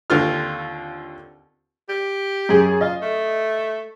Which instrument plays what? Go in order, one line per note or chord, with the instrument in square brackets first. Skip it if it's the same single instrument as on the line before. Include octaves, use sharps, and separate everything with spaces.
[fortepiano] D#2 D3 C4 F4 F6
[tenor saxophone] G4
[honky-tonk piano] F#2 G#4
[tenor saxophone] F4 [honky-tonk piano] D#5
[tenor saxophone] A3